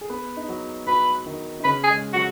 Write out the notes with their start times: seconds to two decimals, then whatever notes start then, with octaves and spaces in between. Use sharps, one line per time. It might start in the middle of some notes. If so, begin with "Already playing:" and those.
0.01 G#4
0.10 B3 B4
0.37 D#4
0.48 F#3 F#4
0.87 F#3 F#4 B4
1.26 D#3 D#4
1.59 D#4
1.64 C#3 C#4 B4
1.84 G#4
1.90 G#3
2.13 F#3 F#4